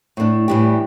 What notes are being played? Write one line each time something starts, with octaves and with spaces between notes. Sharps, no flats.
A2 A3 D4
A2 E3 G3 D4 G4